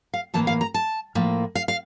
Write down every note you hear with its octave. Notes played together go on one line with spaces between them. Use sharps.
F5
A2 E3 A#3 A5
F5
A#5
A5
A2 F3 A#3
F5
F5